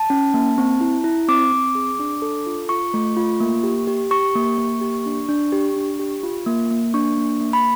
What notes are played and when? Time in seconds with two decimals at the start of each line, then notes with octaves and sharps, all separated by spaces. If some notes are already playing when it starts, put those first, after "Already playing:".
Already playing: A5
0.10 C#4
0.34 A#3
0.58 C4
0.81 E4
1.04 E4
1.28 C4 D6
1.52 C4
1.75 G#4
1.99 D4
2.22 A4
2.46 F4
2.69 F4 C#6
2.94 A3
3.17 F4
3.40 A#3
3.63 G4
3.87 G4
4.11 G4 C#6
4.35 A#3
4.58 A#3
4.81 G4
5.06 D4
5.29 D4
5.52 G4
5.76 D4
5.99 G4
6.23 F4
6.46 A#3
6.71 A#3
6.94 D4 C#6
7.17 A#3
7.41 A#3
7.53 B5